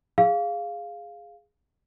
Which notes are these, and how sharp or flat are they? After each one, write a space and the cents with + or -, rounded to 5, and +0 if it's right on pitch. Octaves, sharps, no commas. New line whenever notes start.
G#4 -5 F5 +0